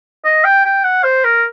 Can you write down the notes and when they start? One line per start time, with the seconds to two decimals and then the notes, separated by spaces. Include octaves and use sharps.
0.25 D#5
0.44 G5
0.65 G5
0.84 F#5
1.04 C5
1.24 A#4